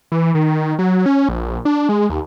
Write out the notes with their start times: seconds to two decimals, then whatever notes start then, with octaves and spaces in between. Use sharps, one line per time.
0.12 E3
0.35 D#3
0.79 F#3
1.06 C#4
1.29 A#1
1.65 D4
1.89 G#3
2.10 D#2